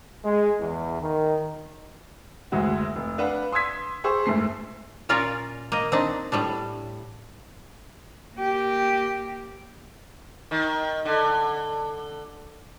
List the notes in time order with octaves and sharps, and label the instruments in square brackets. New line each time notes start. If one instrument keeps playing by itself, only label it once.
[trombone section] G#3
E2
D#3
[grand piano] F#1 D2 G#3 F#4
F1
D4 B4 F5 F#5
C6 D#6 E6 G#6 B6
G#4 C5 C#6 E6
F#1 G#2 A3 C7
[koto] A#2 C#4 F4 A#4 C#5 D5
A#3 D#5
C4 D4 D#4
A2 G3 A3 D4
[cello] A#3 G4
[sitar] D#3
D3